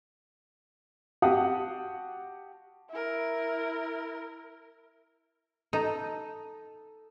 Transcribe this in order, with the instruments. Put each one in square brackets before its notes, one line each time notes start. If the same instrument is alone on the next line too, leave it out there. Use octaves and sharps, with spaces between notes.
[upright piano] F#4 G4 F5 F#5 A5 D#6
[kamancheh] E4 A#4
[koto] D#4 [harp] A4